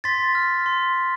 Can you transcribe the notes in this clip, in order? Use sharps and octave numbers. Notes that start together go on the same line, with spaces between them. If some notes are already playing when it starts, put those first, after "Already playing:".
C6 A6 B6
F6
C6